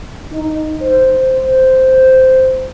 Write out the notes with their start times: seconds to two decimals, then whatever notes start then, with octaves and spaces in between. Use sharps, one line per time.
0.31 D#4
0.81 C5